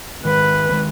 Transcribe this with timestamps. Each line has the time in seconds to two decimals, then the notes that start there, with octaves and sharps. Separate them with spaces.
0.24 G#2 D#3 G#3 B4
0.71 D#3 G#3